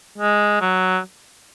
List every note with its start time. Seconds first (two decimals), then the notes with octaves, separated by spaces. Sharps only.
0.18 G#3
0.61 F#3